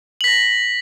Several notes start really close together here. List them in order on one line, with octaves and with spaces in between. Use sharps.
F#7 B6 A#6